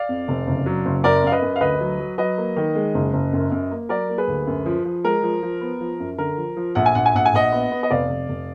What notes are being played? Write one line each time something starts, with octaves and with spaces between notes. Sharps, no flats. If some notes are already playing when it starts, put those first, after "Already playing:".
Already playing: D5 F5
F2
F1
F#1
F#3
F#1
F#2 A#4 D5
F#2 F5
B4 D#5
F#2
F5
D2 B4 D#5
F#3
F#3
F#3 B4 D#5
A#3
D#3
G#3
F#1
F#1
F#2
F#2
A#3
F#3 A#4 D5
A#3
G#4 B4
D2
F#2
F3
F3
G#3 A#4
F3
F3
B3
F3
F#2
D3 A#4
F3
F3
A#1 F#5
G#5
A#1 F#5
G#5
A#1 F#5
G#5
A#1 D#5 F#5
B3
B3
D#5
F1 D5 F5
F1
F1